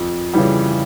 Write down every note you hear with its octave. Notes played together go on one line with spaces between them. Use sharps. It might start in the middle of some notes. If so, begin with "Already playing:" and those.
Already playing: F2
C#3 E3 G3